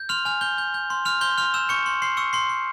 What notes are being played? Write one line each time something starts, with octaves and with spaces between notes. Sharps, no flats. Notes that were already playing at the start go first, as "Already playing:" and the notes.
Already playing: G6
C6 F6 F7
G#5 F6 F7
G6 G7
G6
G6
C6
C6 F6 F7
C6 G6 G7
C6 F6 F7
E6 G6 E7
C#6 G6 C#7
C6
C6 C7
C#6 E6 C#7
C6 C7
C6